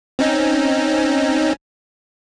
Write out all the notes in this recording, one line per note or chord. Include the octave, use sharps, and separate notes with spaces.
C4 C#4 D#4